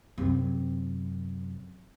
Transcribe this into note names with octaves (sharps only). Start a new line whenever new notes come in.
F#2 C3